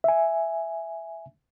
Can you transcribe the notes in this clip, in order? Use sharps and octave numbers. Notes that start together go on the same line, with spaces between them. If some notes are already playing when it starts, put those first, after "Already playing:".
E5 G#5